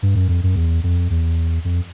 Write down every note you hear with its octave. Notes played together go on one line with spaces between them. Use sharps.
G2
F#2
F2
F#2
E2
F2
E2
F2